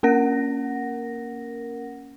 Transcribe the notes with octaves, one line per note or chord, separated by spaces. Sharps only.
A#3 C#4 A#4 F#5 A#6